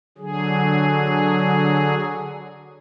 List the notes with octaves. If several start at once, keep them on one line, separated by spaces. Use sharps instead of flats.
D3 F#3 G#4